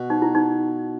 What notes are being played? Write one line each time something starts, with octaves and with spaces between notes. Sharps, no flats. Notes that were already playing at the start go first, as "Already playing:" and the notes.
Already playing: B2
D#4
E4
D#4